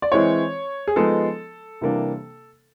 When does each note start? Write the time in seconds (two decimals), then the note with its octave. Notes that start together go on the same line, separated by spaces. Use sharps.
0.02 D5
0.12 E3 G#3 C4 E4 C#5
0.88 G#4
0.96 F3 G#3 B3 D#4 A4
1.81 C3 E3 G3 A#3 D4